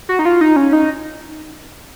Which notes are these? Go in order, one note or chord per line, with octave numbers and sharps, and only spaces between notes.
F#4
D#4
F4
D#4
C#4
D#4